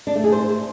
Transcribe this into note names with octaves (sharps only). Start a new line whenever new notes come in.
D4
A3
G#4
C5